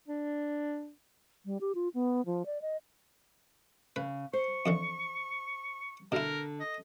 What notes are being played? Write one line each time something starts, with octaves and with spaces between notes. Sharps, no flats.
D4
G3
G4
F4
B3
F3
D5
D#5
C#3 B4
C5 C#6
F2 D3 E3
B2 D3 E4 A#4
D#5